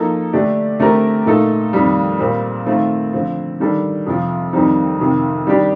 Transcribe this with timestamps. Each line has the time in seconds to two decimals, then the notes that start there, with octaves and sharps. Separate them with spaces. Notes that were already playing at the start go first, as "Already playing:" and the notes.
Already playing: F3 A#3 D#4 A4
0.33 D3 A3 D4 G4
0.80 D3 A3 C4 G4 A#4
1.26 A#2 A3 D#4 A4
1.73 F2 D#3 G3
2.19 A#2 G3 C4
2.66 D#3 A3 C4 F4
3.13 D3 F3 C4
3.60 D#3 G3 D4 A4
4.06 F2 C3 F3
4.53 F2 D#3 G3 C4 D#4
4.99 F2 C3 D#3
5.47 D#3 G3 D4 G4